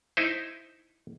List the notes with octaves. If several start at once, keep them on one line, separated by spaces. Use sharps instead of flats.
D#4 E4 C5